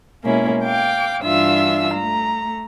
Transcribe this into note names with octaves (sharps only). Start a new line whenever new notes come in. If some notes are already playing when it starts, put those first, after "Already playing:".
B2 G#3 A#3 C#4 E4
F5 G5 D6
G2 E3 D4 F4 E5 E6
A3 A#5